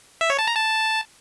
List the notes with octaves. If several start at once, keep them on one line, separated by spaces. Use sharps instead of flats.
E5
C#5
A5
A#5
A5